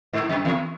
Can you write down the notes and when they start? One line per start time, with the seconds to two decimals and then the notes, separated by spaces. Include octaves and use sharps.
0.13 G#2
0.29 F#2
0.45 E2